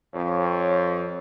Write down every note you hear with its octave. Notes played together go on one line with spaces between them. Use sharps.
F2 C#5